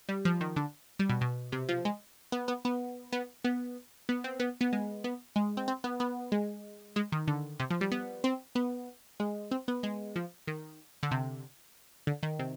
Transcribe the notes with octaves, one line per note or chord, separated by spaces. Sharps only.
G3
F3
D#3
D3
G3
B2
B2
C3
F3
G#3
B3
B3
B3
B3
B3
B3
C4
B3
B3
G#3
B3
G#3
C4
C4
B3
B3
G#3
G#3
D#3
D3
C3
F3
G3
B3
C4
B3
G#3
C4
B3
G#3
F3
D#3
D3
C3
D3
D#3
C3